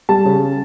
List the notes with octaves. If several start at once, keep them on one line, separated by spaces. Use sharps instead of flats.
G3 A5
C#3